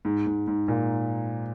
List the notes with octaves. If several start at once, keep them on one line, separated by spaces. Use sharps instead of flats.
G#2
G#2
G#2
A#2